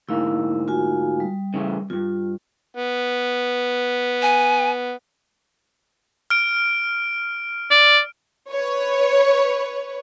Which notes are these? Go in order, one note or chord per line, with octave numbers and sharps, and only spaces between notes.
D2 G#2 A#3 E4
F4 F#4 G#5
G3
C#3 E3 A3
E2 G2 F4
B3
G#5
F6 D7
D5
B4 C#5